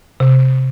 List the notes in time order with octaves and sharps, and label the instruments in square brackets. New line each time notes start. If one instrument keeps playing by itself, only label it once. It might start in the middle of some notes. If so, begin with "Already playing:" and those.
[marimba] C3